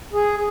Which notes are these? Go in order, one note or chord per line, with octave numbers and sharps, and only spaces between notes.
G#4